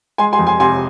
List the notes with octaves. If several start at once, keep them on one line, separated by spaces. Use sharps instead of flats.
G#3 G#5 C6
G#5 C6
F2
G#5 C6
C3 G#5 C6